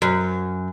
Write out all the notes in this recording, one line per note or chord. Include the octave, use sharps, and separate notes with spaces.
F#2